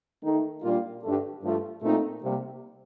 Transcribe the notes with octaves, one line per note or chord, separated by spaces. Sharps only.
D#3 A3 D#4
A#2 G3 A#3 D4 F4
G2 D3 A3
G2 F3 A3
A#2 A3 C4 D#4
C3 G3 A#3